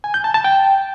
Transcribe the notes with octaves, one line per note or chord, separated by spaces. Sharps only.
G#5
G6
A5
A5
G5